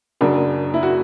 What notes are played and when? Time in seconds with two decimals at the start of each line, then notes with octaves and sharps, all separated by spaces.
0.21 F#1 F#2 C#3 F#3 D4
0.74 E4
0.83 F#4